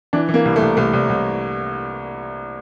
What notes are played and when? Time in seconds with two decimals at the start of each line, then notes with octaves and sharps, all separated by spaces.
0.13 E3 D4
0.29 E3
0.34 A#3
0.45 C2
0.56 A3
0.62 C2
0.77 C2 A3
0.93 C2
1.10 C2